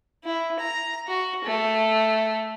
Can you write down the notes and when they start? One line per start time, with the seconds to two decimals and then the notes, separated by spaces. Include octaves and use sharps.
0.24 E4
0.59 A#5
1.08 F#4
1.44 A3